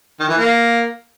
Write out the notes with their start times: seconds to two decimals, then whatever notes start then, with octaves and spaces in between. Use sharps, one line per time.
0.20 D#3
0.29 E3
0.37 A#3